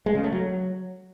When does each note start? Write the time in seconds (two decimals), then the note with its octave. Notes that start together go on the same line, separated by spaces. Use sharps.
0.06 G#3
0.15 C#3
0.24 A3
0.32 F#3